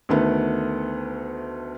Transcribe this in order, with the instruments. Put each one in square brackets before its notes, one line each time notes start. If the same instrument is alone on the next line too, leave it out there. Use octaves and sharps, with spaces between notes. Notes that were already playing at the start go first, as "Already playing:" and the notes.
[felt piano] D2 D#3 A3 B3